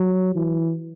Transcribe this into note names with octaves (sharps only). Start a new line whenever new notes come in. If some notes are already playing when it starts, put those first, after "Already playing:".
Already playing: F#3
E3